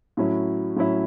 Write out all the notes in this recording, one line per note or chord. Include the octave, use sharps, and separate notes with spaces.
A2 F#3 C#4 E4
A2 F#3 C#4 E4